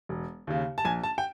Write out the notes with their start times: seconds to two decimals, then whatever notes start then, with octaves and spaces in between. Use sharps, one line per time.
0.09 E1
0.47 D#2 C#3
0.78 A5
0.85 A#1 G#5
1.03 A5
1.18 G5